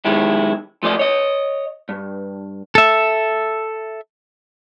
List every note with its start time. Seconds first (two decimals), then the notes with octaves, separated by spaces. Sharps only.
0.05 B1 D#3 G#3 E4 G4
0.83 F3 A3 D5 D#5
0.99 C#5 D#5
1.89 G2
2.75 A4 E5